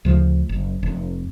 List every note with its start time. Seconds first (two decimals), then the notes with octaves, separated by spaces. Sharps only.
0.05 D2 C#3 F3 A3
0.49 F#1
0.83 F1